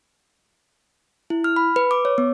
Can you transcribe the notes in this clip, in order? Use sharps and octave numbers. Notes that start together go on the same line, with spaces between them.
E4
F6
B5
B4
D6
C#5
B3